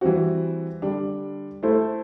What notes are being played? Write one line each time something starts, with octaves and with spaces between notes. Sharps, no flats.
E3 G3 C4 F#4
D3 G3 D4
A3 E4 A4 C5